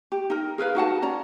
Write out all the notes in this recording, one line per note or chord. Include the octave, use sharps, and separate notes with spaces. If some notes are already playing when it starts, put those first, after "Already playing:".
G4
D#4 A#4
G#4 A#4 B4 F5
D#4 F#4 F#5 A5
C#4 D5 A#5